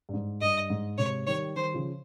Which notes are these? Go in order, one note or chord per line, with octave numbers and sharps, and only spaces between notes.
G2
G#2
G2 D#5
G#2
G#2 C3 C#5
D#3 G3 C#5
D#3 G3 C5
C#3 F3